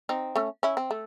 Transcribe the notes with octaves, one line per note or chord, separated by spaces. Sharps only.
C4 D#4
A3 C#4
C#4 E4
C4
A3